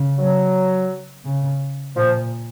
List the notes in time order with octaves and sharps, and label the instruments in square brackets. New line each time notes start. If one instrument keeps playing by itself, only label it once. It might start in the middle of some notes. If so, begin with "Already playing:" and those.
Already playing: [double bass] C#3
[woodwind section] F#3
[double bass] C#3
[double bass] A#2 [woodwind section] F3